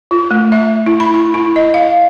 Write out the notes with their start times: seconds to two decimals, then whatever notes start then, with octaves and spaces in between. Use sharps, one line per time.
0.11 F4
0.31 A3
0.52 E5
0.86 E4
1.00 B5
1.14 E4
1.34 E4
1.56 D#5
1.74 F5